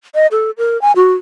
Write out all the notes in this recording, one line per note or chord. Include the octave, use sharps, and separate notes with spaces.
D#5
A4
A#4
G#5
F#4